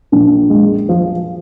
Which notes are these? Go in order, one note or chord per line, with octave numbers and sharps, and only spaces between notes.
A#1
G#3
F3